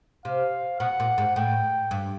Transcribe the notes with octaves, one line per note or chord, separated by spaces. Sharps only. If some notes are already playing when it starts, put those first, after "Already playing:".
C3 F5
B2 F#5
A#2
G#2
A2 G5
G2